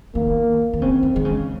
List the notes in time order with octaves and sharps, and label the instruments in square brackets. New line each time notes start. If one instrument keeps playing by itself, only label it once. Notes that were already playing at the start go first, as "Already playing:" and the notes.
[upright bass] D#3 [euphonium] A#3
[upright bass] D#3
[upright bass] C#3 [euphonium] C4
[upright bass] D#3
[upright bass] D#3 [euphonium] G#3
[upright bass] C#3